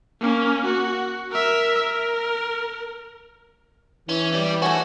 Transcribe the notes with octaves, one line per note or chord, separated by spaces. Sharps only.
A#3 C#4
F#4
A#4 E5
A#4
E3 C#4
G4 D5
A3 C#4 F#4